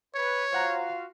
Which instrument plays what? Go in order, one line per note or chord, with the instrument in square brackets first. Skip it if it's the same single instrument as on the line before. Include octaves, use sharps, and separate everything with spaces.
[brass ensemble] B4 [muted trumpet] C#5
[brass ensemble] F4 F#4 F5 [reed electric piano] C5 F#5 A#5